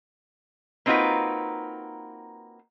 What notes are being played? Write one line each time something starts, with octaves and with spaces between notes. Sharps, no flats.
A#3 C4 D#4 F4 F#4 B4